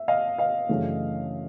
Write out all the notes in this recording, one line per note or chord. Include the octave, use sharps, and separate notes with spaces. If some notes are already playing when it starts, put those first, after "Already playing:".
Already playing: E5
D#5 F5
D#5 F5
F#2 C#3 E3 A3 D4